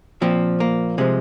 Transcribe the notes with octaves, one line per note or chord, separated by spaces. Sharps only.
A#2 F3 C4
A#3
C3 F3 G#3